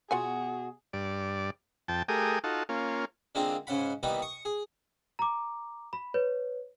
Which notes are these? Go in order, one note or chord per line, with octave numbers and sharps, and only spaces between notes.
B2 F4 F#4 G#4 F#5 G#5
G2 D5
F2 G5 A5
A3 G4 G#4 A#4 D#6
D#4 F4 F#4 A4
A#3 C#4 F4
D3 G#3 A#3 C4 D4 F4
G#2 C#3 C#4 F#5 B5
D#2 E3 G3 B3 D#4 B5
C#6 D#6
G#4
A#5 D6
B5
B4 C#5